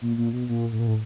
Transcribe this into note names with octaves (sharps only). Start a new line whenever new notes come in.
A#2
A#2
B2
A#2
A2
A#2
A2